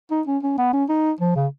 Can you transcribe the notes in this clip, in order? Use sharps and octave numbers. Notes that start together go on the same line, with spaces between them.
D#4
C#4
C#4
B3
C#4
D#4
F3
C#3